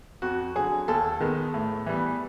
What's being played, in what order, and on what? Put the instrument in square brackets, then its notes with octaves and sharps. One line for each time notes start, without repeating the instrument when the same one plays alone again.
[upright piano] F2 F#4
D3 F#3 G#4
D#2 A4
D#3 G#3 B3
A2
E3 G3 B3